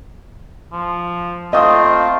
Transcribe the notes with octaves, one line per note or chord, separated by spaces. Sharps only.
F3
A3 C4 F4 D#5 D#6